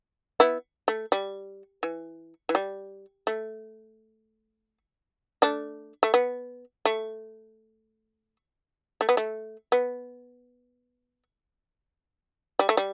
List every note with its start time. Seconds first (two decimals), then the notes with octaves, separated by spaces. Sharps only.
0.40 B3 E4
0.88 A3
1.12 G3
1.83 E3
2.49 E3
2.55 G3
3.27 A3
5.42 A3 D4
6.03 A3
6.14 B3
6.85 A3
9.01 A3
9.09 B3
9.17 A3
9.72 B3
12.59 G3
12.69 A3
12.77 G3